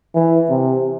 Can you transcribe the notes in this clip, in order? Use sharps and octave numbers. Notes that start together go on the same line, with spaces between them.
E3
C3